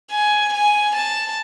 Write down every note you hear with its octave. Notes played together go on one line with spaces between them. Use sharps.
G#5
G#5
A5